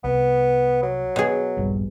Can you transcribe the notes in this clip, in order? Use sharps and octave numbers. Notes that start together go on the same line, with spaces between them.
C2 B3
F#3
B2 G#4
D#1 A#1 G2